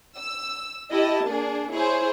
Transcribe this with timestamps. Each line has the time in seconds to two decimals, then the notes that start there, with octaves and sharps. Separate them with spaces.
0.17 E6
0.91 E4 G4 D#5 A5
1.25 A#3 D4 G#4
1.72 E4 G#4 C5 C#5